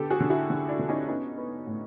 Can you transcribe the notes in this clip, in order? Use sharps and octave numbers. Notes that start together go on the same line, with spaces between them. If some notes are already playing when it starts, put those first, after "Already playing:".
Already playing: D3 B3 G4 A4
F#4 G#4
D3
E4 F#4
D3
D4 E4
D3
C#4 D#4
B3 C#4 D#4
B3
A2